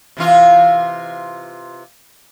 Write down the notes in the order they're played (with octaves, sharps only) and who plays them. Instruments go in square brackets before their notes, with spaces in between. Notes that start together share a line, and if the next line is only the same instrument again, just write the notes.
[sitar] C3 E3 F4